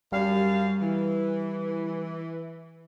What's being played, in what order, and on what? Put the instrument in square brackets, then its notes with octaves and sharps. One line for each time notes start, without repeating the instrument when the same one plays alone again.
[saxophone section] F#2 F5 [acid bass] G3
[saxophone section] E3